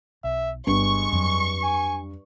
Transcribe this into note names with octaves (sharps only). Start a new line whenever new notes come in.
B1 E5
G1 G2 G#3 B3 C#6
F2 F#3
G#5